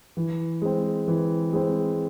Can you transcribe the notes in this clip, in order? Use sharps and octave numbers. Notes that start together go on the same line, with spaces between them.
E3
G#3 C4
E3
G#3 C4